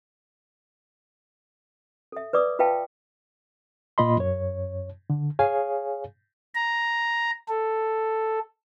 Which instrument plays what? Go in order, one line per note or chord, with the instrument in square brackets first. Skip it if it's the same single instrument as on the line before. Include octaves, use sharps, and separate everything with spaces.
[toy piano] A4 E5
B4 D5 D6 D#6
F4 B4 E5 F5 G5 A5
[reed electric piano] A#2 A#3 F4 D#5 B5 C6
F#2 C#5
D3
G#4 C#5 F5 G#5
[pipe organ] A#5
A4